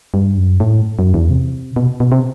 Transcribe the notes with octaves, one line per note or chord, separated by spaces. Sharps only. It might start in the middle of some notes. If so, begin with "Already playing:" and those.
G2
F#2
A2
F#2
E2
C3
B2
B2
C3